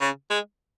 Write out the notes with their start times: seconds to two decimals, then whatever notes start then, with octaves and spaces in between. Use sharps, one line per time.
0.01 C#3
0.30 G#3